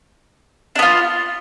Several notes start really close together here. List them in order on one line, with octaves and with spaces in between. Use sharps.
D4 B3 F4